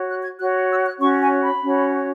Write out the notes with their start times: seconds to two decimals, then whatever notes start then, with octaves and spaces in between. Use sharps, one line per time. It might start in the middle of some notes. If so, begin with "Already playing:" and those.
Already playing: F#4 C#5
0.08 F#6
0.23 G#6
0.39 F#4 F#6
0.42 C#5
0.69 E6
0.84 F#6
0.99 C#4 F#4 C#5 C#6
1.20 G#5
1.41 B5
1.61 C#4 F#4 C#5